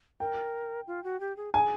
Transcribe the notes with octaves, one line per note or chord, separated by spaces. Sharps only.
A#4 G5
F4
F#4
G4
G#4
G#4 G#5